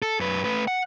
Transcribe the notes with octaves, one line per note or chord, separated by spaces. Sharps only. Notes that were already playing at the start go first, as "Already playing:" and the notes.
A4
F#2 B4
A3 B4
F#5